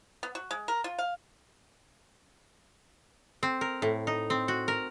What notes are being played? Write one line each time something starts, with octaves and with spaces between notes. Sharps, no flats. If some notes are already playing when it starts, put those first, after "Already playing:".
B3
F#4
G#3
A#4
F4
F5
C4
A#4
A2
D#4
C4
F#4
A#4